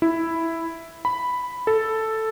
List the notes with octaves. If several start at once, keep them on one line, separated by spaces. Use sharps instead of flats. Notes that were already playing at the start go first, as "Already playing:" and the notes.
E4
B5
A4